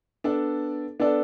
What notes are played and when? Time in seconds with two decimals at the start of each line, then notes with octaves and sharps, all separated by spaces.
0.24 B3 D4 A4 D5
1.00 B3 D4 A4 D5